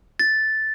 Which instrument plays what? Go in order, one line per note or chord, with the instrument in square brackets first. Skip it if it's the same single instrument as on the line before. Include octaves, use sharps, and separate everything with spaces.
[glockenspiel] A6